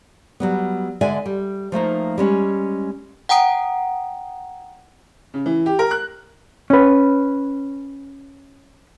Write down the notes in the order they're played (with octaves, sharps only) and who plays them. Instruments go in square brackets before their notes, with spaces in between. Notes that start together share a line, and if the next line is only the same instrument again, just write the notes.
[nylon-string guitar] F#3 G3 B3
D3 G#3 D5 E5 G#5
G3
F3 A3 A#3 D#4
G3 G#3 C#4
[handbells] F#5 G5 A#5 D#6 D7
[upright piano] C#3
E3
G4
A#4
F#6
[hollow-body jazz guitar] C#4 B4